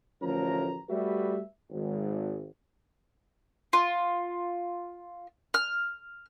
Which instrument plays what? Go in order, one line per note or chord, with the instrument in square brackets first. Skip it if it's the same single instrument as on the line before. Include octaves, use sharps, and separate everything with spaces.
[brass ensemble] A1 D2 F3 C#4 A#4 A#5
G3 A3 F#4 G4 B4 E5
G#1
[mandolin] F4
F6